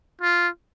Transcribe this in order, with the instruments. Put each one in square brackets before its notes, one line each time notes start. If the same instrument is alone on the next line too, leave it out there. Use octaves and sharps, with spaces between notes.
[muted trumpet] F4